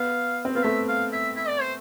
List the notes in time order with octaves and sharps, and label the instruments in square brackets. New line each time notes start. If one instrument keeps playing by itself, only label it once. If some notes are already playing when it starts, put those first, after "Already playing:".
Already playing: [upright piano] B3 [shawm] F5
[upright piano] C4
[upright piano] B3 [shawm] F5
[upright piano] A3 [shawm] E5
[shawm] F5
E5
E5
D5
C5